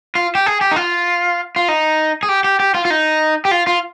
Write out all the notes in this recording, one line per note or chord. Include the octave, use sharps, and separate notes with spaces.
F4
G4
G#4
G4
D#4
F4
F4
D#4
G#4
G4
G4
G4
F4
F4
D#4
G4
F4
F4